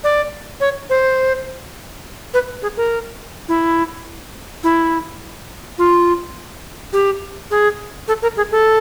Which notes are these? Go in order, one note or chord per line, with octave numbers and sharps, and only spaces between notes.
D5
C#5
C5
B4
G#4
A#4
E4
E4
F4
G4
G#4
A4
A#4
G#4
A4